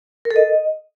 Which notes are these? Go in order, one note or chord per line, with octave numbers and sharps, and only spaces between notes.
A#4
A4
D#5